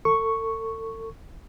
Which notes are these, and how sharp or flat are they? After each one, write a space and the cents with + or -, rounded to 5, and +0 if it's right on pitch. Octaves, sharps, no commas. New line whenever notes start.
A4 +35 C#6 +0